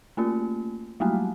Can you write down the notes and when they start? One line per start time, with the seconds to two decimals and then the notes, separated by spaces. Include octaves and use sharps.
0.17 A3 A#3 C#4 F4
1.00 F#3 G3 A3 A#3